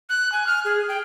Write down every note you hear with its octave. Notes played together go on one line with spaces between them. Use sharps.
F#6
G#5
F6
G#4
G5